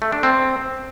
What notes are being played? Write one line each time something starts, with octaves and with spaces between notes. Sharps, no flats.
A3
D4
C4